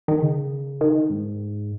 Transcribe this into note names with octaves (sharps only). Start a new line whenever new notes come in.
D#3
C#3
D#3
G#2